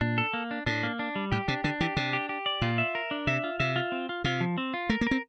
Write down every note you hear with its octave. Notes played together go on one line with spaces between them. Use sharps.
A#2 D4
A4
A#3
D4
A2 D4
A#3
D4
G3
A2 G4
C3 D4
D3 D4
E3 G4
C3 D4
G4
G4
D5
A#2 F4
E5
A#4
D4
C3 E5
F4
C3 E5
F4
C4
F4
C3 F4
F3
C4
F4
A3 A#4
A#3
C4 A#4